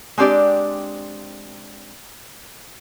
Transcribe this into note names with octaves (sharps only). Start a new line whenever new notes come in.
G#3 C4 D4 G4 D5